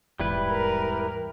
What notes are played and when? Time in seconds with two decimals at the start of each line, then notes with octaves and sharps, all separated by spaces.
0.20 D1 E2 G#2 G3 E4 B4
0.51 A#4